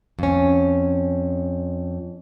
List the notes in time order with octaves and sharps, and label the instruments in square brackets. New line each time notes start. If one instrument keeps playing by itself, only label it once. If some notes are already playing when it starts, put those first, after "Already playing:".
[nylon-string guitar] F2 C#4